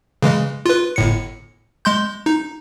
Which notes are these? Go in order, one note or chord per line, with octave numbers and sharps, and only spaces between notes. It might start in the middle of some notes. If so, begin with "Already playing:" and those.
C#3 E3 G#3
F4 B4
G1 A2 C#7
G#3 C6 G6
D#4